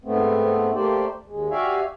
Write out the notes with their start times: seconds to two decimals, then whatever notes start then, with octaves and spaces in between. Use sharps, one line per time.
0.05 G#2 A3 B3 C4
0.74 A3 A#3 G4 C5 D5
1.26 D#2 G#3
1.51 F#4 G4 D5 E5 F5 G#5